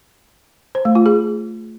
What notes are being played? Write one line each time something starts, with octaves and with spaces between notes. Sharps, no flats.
C5
A3
F4
G#4